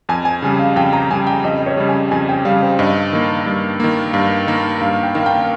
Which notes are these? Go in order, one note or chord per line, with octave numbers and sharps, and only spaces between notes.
F2 G#5
G#5
C#3 G3
F5
F2 G5
A#5
C#3 G3 G#5
G5
F2 D#5
C#5
C#3 G3
G#5
F2 G#5
G5
C#3 G3 F5
C5
G2 D#5
D#3 A#3
G2
D#3 A#3
G2 F5
D#3 A#3
G2 F5
G5
D#3 A#3 F5
G5